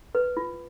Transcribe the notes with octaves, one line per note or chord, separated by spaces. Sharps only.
B4
F4